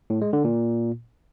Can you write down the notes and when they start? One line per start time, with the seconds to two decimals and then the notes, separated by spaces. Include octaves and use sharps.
0.10 A2
0.22 G#3
0.33 D3
0.45 A#2